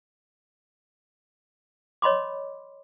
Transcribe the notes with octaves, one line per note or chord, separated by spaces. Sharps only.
C#5 D#5 B5 C6 D6